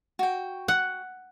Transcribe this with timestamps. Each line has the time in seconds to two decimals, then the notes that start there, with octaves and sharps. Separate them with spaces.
0.19 F#4 G5
0.68 F#5